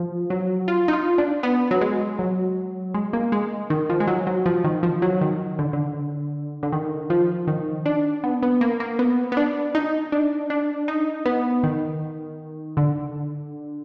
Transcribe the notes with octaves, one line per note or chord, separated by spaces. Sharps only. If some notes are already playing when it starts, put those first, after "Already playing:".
Already playing: F3
F#3
F4
D#4
F4
D4
B3
F#3
G#3
F#3
G#3
A#3
G#3
D#3
F3
G#3
F#3
F#3
F3
D#3
F3
F#3
D#3
D3
D3
D3
D#3
F3
D#3
D4
B3
B3
A#3
A#3
B3
B3
D4
D#4
D4
D4
D#4
B3
D#3
D3